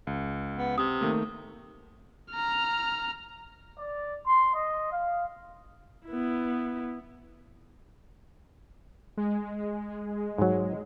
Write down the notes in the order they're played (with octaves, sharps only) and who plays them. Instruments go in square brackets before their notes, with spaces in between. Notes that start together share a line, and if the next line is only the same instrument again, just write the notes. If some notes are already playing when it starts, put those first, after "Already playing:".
[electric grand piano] C#2
[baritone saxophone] B3
[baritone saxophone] C3 [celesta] D#6
[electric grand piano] D#3 A3 A#3
[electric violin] A#5 F6
[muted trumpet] D5
C6
D#5
F5
[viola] B3 E4
[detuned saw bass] G#3
[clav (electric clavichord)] G#2 F#3